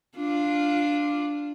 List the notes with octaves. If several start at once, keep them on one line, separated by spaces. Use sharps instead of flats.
D4 F4